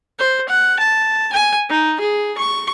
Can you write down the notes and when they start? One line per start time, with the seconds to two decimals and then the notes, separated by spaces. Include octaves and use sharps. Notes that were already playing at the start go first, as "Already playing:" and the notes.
0.19 C5
0.49 F#5
0.79 A5
1.32 G#5
1.69 D#4
2.00 G#4
2.38 C#6